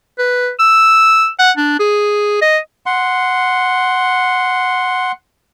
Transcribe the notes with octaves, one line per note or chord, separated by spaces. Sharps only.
B4
E6
F#5
D4
G#4
D#5
F#5 C6